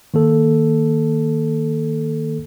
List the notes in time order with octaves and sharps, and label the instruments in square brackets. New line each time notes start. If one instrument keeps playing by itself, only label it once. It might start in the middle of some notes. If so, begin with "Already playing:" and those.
[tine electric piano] D#3 A#3 A4